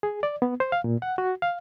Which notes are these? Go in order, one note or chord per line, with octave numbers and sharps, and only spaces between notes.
G#4
D5
B3
C5
F5
A#2
F#5
F#4
F5